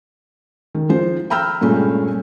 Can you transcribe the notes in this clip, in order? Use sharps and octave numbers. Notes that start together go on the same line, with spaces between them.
D#3
F3 C5
G5 A#5 B5 E6 F6 G6
G2 A#2 G#3 A3 C#4